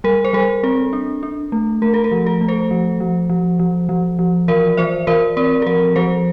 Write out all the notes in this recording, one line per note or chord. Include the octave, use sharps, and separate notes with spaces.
G3 A#4
C5
G3 A#4
C4 A4
D4
D4
A3
A3 A#4
A4
A#4
F3
A4
A3
A4 C5
F3
F3
F3
F3
F3
F3
E3 A#4 D5
E3 C5 E5
E3 A#4 D5
C4 A#4 D5
A4
F3 A#4
F3 A4 C5